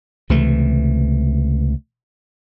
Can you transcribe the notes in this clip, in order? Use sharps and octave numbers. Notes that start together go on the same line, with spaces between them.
C#2 C3 E3 A3